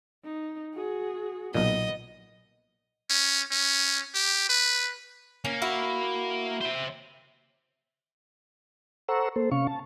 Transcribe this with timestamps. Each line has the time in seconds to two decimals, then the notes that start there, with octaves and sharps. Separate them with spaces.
0.24 D#4
0.74 F#4 G#4
1.54 B1 A#2 B3 D#5
3.10 C#4
3.51 C#4
4.14 G4
4.49 B4
5.45 A#3 C#4
5.62 E4 F#4
6.61 C5 E5
9.08 A4 C5 F#5 A#5 C#6 E6
9.36 A#3 A4 C5
9.51 C3 C#4 F5 C#6
9.67 A5